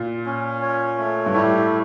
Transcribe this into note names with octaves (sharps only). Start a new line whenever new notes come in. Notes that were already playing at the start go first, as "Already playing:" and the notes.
Already playing: A#2
C#4
C#5
A3
G2
A2 G3